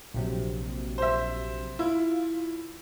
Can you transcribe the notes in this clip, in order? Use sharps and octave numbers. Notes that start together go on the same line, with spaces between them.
A#1 C3 F#3
C5 E5
E4 F4